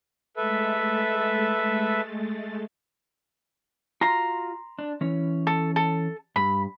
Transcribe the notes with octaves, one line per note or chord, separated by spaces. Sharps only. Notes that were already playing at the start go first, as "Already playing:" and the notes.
G#3 A3 A4 B4 E5 A6
F4 F#4 A#5 C6
D4
E3 C#4 C#5
A4
A4
G2 B5